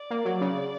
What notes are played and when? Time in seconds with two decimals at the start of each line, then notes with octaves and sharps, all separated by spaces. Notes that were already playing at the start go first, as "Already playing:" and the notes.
Already playing: D5
0.10 A#3
0.25 F#3
0.41 C#3